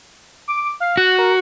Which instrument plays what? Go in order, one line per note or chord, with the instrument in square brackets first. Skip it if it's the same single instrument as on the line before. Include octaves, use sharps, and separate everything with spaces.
[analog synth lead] D6
F5
[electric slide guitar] F#4 [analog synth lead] F#5
[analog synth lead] A#4